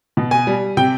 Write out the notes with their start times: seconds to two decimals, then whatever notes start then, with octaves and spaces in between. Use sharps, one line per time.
0.17 B2
0.31 G#5
0.47 G3
0.77 C3 G5